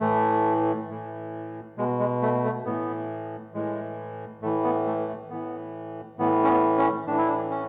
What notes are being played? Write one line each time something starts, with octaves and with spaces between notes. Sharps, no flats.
A2 E3 A3
A2 E3
B2 G#3
G#3
A3
A3
A2 E3 B3
A2 E3 G#3
A2 E3 A3
B3
A3
A3
A2 E3 B3
A2 E3 B3
C#4
B3
C#4
A2 E3 D4
E4
D4
C#4